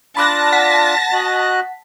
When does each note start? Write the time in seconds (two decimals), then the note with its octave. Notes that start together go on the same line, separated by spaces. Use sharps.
0.17 D4 F4 A5 B5 D6 F#6 A#6
0.52 F#5 B6
1.13 F#4 D#5 F#6